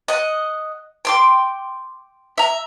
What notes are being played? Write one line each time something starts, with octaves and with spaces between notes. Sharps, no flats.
D#5 F#5
G5 C6 D6
E5 A#5